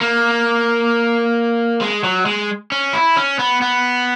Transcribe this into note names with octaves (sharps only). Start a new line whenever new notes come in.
A#3
G#3
F#3
G#3
C#4
E4
C#4
B3
B3